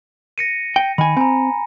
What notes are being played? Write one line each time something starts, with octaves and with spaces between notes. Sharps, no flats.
A#6 C#7 D#7
G5
D#3 G#5 B5
C4 G#5 A#5